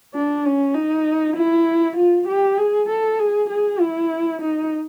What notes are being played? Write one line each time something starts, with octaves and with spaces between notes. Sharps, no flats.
D4
C#4
D#4
E4
F4
G4
G#4
A4
G#4
G#4
E4
D#4